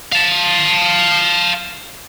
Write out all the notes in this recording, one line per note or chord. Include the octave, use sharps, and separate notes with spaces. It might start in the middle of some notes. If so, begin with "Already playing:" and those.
F5 A5